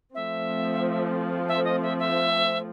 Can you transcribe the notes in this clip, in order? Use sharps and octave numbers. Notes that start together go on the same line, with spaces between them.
F3 A3 C4 E5
E5
D#5
E5
E5